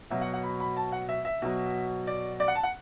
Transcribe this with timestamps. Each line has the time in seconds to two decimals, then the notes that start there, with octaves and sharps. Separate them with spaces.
0.10 B2 F#3 E5
0.21 F#5
0.33 F#5
0.44 B5
0.60 B5
0.77 A5
0.92 F#5
1.09 E5
1.25 E5
1.42 B2 F#3
2.07 D5
2.40 D5
2.48 F#5
2.55 A5
2.63 F#5